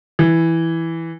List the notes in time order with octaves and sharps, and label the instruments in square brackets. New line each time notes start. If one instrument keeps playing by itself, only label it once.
[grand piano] E3